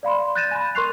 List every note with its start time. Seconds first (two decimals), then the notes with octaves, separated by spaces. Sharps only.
0.03 D5 F5 B5 C6
0.35 F#6 G6 A6 A#6 D#7 E7
0.51 G#5 B5
0.75 A#4 C6 C#6 F#6 C7 F7